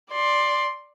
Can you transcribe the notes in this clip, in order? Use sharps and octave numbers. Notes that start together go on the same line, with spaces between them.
D5 C6